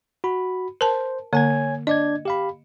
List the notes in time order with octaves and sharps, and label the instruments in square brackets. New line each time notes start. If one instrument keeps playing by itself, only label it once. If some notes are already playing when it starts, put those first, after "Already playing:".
[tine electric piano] F#4 B5
[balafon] A#4 A5 [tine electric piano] C5
[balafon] D3 A#3 [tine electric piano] C#5 G#5 G#6
[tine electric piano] D4 D5 G#6 [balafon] D#5
[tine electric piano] G4 F5 B5